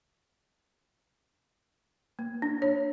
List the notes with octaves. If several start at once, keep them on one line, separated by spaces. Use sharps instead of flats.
A#3
D4
C#5